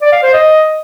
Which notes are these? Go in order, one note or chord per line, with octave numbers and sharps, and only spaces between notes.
D5
F5
C5
D#5